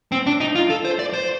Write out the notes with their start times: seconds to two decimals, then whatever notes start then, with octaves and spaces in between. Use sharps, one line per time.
0.12 C4
0.27 D4
0.40 D#4
0.55 F4
0.70 A4
0.85 C5
0.99 D5
1.13 C5